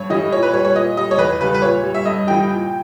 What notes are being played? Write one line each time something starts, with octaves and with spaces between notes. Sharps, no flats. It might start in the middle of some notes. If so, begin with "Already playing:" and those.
Already playing: G2 C#5
E3 G3 D#5
A#2 C#5
B4
G3 C#5
C#5
A#2 D#5
G3 D#5
C#5
E2 B4
C#3 G3 B4
B4
A#2 C#5
G3
E5
G2 D#5
E3 G3 G5
A#2